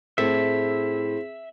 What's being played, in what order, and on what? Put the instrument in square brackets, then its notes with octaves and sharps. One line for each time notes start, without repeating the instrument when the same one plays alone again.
[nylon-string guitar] A2 A4 [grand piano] C4 [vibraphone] G#4 [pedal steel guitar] E5